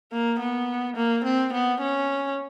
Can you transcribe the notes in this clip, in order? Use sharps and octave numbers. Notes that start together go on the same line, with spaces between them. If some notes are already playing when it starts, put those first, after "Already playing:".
A#3
B3
A#3
C4
B3
C#4